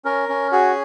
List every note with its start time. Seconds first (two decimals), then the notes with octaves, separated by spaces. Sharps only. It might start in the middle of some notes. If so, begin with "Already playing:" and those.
0.05 C#4 A#4
0.29 C#4
0.52 F#4 G#4